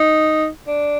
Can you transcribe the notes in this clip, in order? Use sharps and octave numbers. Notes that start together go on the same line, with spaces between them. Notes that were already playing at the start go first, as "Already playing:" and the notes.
Already playing: D#4
D4